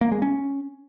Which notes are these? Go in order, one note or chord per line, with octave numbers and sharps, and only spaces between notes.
A#3
G#3
C#4